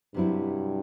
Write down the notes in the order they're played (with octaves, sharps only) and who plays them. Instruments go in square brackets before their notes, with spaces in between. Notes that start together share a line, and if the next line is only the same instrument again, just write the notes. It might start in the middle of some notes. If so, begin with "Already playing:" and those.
[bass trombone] G2 [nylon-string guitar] C3 F#3 C4 E4